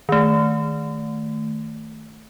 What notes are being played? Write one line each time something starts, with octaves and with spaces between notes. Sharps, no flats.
D#3 A3